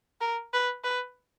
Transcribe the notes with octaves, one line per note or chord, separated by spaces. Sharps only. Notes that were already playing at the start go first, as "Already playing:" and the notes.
A#4
B4
B4